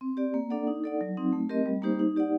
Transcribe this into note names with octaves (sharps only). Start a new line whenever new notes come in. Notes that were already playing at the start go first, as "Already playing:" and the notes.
C4
G4 D5
A#3
D4 A4 D5 F#5
D#4
A4 D5 F#5
F#3
C4 D#4
A3
C4 G4 A#4 D#5
G3
A#3 D#4 G4 C5
D#4
G4 D5 F#5